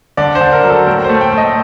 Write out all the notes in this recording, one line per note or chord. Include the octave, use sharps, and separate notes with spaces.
D3 D5
C5
D3
A#4
F#3
A4
A2 A#4
C5
A3
G5
A3 D#5